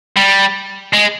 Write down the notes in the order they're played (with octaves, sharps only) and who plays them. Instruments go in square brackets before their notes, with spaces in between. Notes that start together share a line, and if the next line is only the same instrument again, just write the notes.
[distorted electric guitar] G3
G#3